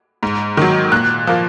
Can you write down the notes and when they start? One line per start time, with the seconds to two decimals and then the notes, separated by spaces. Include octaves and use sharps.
0.23 G#2
0.57 D#3 F#3
0.92 A#2 F#6
1.27 F3 A#3